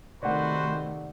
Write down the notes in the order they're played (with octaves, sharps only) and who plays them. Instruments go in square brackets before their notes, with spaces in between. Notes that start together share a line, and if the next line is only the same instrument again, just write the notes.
[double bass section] C3 D#3 A3 [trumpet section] F#4 B4 C5 [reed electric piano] D5 F#5